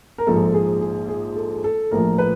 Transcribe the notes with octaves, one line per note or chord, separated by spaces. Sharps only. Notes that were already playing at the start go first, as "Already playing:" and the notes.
A#4
A#1 G#2 F3 G#3 A4
G#4
G#4
G#4
A4
A4
A#1 A2 F3 A#4
B4